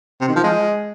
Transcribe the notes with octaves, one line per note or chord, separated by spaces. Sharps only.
C3
D#3
F3
G#3